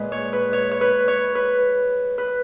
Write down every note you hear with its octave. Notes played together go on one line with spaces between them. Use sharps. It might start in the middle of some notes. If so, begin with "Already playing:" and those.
Already playing: A#2 G#3 B4
C#5
B4
C#5
C#5
B4
C#5
B4
B4